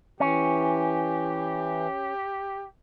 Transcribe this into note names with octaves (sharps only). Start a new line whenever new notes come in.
E3 C#4 G4